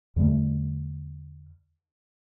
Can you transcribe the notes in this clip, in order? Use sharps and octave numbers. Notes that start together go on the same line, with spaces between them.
E2 D3 G3 A3